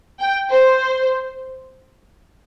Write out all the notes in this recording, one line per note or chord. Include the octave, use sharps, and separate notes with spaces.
G5
C5